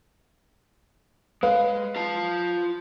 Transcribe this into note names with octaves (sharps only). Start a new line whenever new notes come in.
G#3 B4 F5
F4 A5